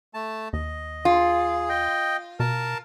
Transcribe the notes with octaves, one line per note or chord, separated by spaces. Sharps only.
A3 A5
D#2 D#5
F4 G#4
D#5 G5
B2 A#4 A5